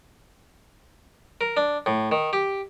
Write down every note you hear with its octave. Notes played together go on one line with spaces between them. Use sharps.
A#4
D4
A2
D#3
G4